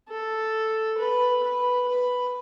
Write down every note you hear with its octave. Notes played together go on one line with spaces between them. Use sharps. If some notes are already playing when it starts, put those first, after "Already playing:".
A4
B4
B4
B4